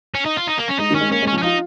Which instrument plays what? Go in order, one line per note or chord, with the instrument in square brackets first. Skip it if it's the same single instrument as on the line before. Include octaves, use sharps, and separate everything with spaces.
[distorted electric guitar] C#4
D#4
F4
D#4
A#3
C#4
[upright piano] G#3 [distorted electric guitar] D#4
[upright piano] D#3 [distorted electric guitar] C#4
[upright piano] G#3
[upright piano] A#3 [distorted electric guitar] C#4
[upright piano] G#3
[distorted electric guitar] C#4
[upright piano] F3
[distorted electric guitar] C#4
[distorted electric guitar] D#4 [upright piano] F4